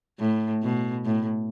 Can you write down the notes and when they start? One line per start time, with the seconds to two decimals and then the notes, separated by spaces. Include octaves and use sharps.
0.19 A2
0.63 B2
1.05 A2